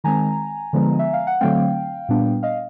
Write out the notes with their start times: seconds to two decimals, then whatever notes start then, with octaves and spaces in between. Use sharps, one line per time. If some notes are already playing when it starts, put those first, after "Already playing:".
0.04 D#3 G#3 C4 G#5 A#5
0.73 D3 F3 G#3 B3
0.99 E5
1.13 F5
1.27 F#5
1.41 D3 F#3 A3 C4 F5 G5
2.09 A#2 G3 B3 D4
2.43 D#5 F5